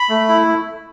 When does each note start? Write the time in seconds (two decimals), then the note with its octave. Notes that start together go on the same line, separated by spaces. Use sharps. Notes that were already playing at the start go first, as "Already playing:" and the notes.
Already playing: B5
0.09 A3
0.29 E4